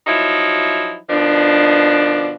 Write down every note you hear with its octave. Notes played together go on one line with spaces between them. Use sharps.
F3 F#3 D#4 E4
B2 D#3 F3 D4